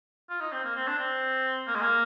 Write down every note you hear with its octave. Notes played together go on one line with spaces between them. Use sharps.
F4
D#4
C4
A#3
C4
D4
C4
A#3
G#3
A#3